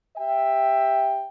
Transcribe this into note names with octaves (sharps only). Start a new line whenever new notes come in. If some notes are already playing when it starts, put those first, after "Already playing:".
G4 E5 G5